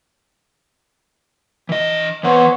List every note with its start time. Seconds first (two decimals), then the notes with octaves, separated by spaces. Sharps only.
1.69 E3 D#5
2.23 E3 B3 C5 C#5 F#5